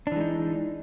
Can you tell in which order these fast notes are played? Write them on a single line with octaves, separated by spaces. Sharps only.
D4 E3 G#3 D#4